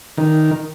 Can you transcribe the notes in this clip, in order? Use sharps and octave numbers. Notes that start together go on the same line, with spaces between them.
D#3